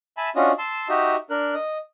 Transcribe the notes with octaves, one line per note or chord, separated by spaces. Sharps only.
E5 G#5 A5 B5
C#4 D4 F4 F#4 D#5
A5 C6 E6
D#4 F#4 G4 D#5 E5
D4 A#4 F#6
D#5